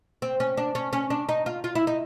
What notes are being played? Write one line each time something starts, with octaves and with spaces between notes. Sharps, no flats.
C4
C#4
D4
C#4
C#4
D4
D#4
F4
F4
E4
D#4